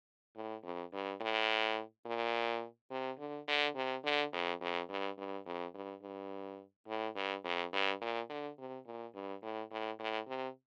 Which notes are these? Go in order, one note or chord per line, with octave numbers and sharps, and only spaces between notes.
A2
F2
G2
A2
A#2
C3
D3
D3
C3
D3
F2
F2
G2
G2
F2
G2
G2
A2
G2
F2
G2
A#2
D3
C3
A#2
G2
A2
A2
A2
C3